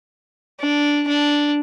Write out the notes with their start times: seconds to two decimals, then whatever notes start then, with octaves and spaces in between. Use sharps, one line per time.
0.60 D4
1.08 D4